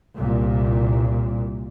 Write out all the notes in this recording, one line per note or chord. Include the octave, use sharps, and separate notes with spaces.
C2 A#2